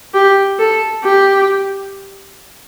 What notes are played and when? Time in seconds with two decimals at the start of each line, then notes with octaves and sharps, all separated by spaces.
0.14 G4
0.59 A4
1.05 G4